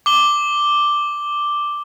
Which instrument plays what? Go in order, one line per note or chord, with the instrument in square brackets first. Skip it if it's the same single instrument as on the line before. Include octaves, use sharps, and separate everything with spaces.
[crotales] D6 G7